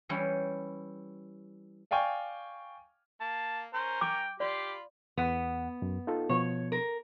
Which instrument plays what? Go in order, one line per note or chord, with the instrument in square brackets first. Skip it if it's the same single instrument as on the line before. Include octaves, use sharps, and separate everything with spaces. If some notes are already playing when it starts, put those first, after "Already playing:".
[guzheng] E3 G3 C#4 E4
[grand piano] D5 F5 G5 G#5 C#6
[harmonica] A#3 [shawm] A5
[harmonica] C#4 A#4 A#5 [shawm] C5
[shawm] G5 [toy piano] D6
[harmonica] F4 B5 C6 [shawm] G4 [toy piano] D5
[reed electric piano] E2 F#5 [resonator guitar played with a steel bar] B3
[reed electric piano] F#2
D#4 F4 A4
[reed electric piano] B2 F3 B3 [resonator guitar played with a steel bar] C#5
[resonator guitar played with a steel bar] A#4